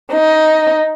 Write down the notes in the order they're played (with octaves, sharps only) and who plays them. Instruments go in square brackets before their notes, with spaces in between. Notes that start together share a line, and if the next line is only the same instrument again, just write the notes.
[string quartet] D#4